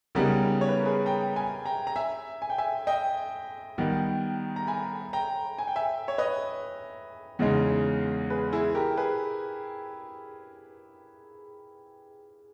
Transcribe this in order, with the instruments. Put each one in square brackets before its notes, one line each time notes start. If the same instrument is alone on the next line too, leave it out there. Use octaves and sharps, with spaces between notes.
[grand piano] C#3 G3 B3 D#4 [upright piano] G4 A#4
[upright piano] C#5
B4
A#4
G#4 B4
G5 A#5
G#5 B5
G5 A#5
A#5
E5 G#5
G#5
G5
E5 G#5
D#5 G5
[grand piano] D#3 G3 B3
[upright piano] A#5
G#5 B5
G5 A#5
G#5
G5
E5 G#5
C#5
B4 D#5
[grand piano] E2 C#3 G#3 D#4
[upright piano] G#4 B4
E4 G#4
G4 A#4
G#4 B4